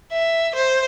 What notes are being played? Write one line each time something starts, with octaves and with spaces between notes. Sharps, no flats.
E5
C5